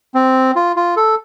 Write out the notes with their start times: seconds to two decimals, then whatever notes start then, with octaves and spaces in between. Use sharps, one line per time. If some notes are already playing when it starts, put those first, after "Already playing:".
0.14 C4
0.56 F4
0.76 F4
0.97 A4